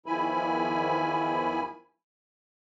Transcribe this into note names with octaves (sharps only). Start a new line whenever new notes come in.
E2 D#3 F3 E4 G#5 B5